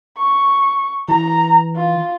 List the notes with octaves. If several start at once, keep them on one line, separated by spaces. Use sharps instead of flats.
C#6
E3 A#5
F4